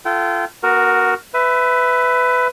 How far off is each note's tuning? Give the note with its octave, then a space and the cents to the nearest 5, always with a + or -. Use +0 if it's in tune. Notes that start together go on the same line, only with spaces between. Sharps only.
F4 -25 A4 -5 G5 -35
B3 -30 F#4 +0 A#4 +0
B4 +20 E5 +0